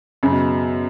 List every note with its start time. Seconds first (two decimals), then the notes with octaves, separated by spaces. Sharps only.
0.23 F#2 C#3
0.32 B2